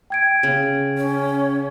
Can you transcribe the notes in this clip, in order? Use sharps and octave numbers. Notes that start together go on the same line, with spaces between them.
G5 G#6 D7
C#3
C#4